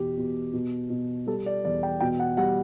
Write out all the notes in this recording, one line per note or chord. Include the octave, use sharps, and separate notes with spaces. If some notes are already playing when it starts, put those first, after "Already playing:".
Already playing: E2 B2 G4
B2
B2
B2
G3 A4
D5
E2 D5
G5
B2 G5
F#5
G3 F#5